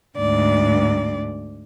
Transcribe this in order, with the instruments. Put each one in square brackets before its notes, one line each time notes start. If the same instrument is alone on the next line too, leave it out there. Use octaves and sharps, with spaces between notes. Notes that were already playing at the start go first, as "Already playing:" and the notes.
[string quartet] D2 G#2 D5